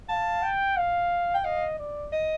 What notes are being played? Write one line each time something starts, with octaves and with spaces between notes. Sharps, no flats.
F5 A5
G5
F5
G5
D#5 F5
D5
D#5